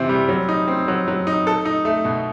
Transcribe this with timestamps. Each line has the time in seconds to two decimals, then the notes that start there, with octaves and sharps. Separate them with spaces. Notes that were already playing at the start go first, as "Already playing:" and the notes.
Already playing: C3 E3 C4
0.09 G3
0.29 F#3
0.49 D#4
0.68 C4
0.88 F#3
1.08 F#3
1.27 D#4
1.47 A4
1.65 D#4
1.85 A3
2.05 B2